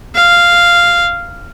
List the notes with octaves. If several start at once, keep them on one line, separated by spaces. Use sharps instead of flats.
F5